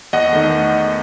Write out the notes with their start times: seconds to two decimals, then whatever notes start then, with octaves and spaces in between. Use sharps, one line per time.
0.13 E2 D#5 F#5
0.33 D#3 A3